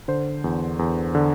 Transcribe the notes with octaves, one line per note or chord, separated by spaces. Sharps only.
D3 C5
E2
E2
D3